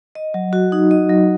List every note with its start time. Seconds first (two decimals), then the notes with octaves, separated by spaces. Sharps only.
0.15 D#5
0.34 F#3
0.53 F#4
0.72 D#4
0.91 D#5
1.09 F#3